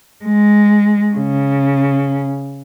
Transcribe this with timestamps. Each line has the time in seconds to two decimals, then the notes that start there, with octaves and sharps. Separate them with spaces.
0.25 G#3
1.15 C#3